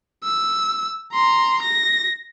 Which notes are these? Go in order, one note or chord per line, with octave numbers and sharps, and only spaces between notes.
E6
A#5 C6
A#6